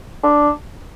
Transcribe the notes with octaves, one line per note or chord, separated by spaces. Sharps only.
D4